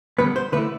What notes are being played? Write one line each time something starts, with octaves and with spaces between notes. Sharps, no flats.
D3 G3 B3 B4
C5
D3 A3 E4 B4